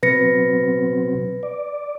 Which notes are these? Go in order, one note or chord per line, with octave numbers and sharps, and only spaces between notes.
B2 F#3 C4 B4 A#6 C#7
D5